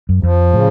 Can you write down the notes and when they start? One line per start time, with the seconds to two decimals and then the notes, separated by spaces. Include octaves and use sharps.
0.09 F#2
0.23 F2 F3
0.53 A2 C#3